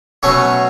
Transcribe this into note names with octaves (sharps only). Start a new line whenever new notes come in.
B2 F#3 A3 C#4 C#5